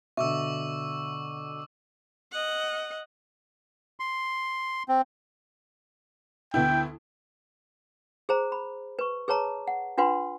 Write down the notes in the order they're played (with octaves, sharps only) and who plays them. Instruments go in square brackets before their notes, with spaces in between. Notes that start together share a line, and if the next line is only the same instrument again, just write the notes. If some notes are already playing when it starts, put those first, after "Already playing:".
[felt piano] B2 D3 [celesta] E5 [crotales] C#6 D6 E6
[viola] D#5 F#5
[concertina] C6
C4
[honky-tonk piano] D2 B3 E4 [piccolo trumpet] G5
[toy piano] G#4 C5 A#5
B5
B4 C#6
G#4 B4 C#5 A5 A#5
F#5
D4 F4 B4 F#5 C6